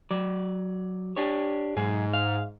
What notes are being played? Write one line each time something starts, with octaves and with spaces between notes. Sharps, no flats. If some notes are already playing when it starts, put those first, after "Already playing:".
F#3 D5
D4 G4 C#5
B1 G#2 G#4
F5